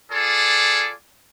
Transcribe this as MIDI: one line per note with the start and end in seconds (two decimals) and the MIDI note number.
0.12 0.91 65
0.12 0.91 68
0.12 0.91 69
0.12 0.91 74